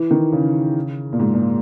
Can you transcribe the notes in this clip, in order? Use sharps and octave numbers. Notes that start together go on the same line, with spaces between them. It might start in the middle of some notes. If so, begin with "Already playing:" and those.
Already playing: E3
D#3
C#3
A#2
G#2
A#2